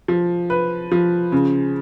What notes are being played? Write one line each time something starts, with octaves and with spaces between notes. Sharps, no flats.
F3
B4
F3
C#3